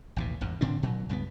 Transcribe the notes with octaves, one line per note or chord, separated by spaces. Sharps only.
A1 D#2 B2
G#1 E2 G2
A2 D3 C4 D4
A#2 F#3
C#2 G2 G3 B3